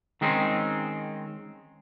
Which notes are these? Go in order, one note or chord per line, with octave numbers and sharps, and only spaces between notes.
D#3 G#3 C4 C#4 D#4